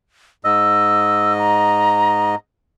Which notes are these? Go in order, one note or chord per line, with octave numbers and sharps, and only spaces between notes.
G#2 D#5 E6
A#5